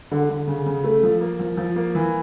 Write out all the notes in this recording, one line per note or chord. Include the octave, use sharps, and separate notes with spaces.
D3
D3
C#3
C#3
A3
F3
A#3
F3
F3
A#3
E3